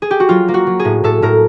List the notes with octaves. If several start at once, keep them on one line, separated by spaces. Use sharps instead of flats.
G#4
G4
F#4
F#3 F4
A#3
F#4
F#3
G#4
A2
A2 A4
A2 A#4